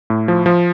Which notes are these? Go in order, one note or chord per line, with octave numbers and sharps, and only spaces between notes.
A2
F3
F3